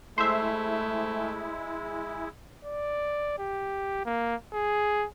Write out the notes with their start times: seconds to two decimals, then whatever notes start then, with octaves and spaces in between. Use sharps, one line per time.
0.18 G#3 A3 E4 C5 E5
2.65 D5
3.39 G4
4.05 A#3
4.53 G#4